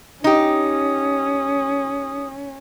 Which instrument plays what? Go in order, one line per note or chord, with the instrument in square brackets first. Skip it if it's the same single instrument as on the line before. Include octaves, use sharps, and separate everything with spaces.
[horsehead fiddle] C#4 [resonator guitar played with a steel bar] D#4 G4 [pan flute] D#6